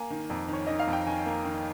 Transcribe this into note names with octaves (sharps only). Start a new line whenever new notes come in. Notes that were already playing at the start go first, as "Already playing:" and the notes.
Already playing: A#3 G#5
D#3
F2
D#3 C#5
D#3 D#5
F5
F2
G5
D#3 G#5
A#3
D#3